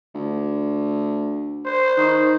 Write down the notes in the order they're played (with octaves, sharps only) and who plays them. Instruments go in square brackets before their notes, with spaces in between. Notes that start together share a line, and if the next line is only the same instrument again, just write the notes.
[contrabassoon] D2
[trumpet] C5
[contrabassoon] D#3